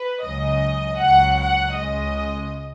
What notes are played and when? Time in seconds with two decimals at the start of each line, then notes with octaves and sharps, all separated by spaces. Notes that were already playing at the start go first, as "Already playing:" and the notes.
Already playing: B4
0.23 C#2 C#3 F#3 D#5
1.00 C#2 C#3 F#3 F#5
1.39 F#5
1.76 C#2 C#3 G#3 D#5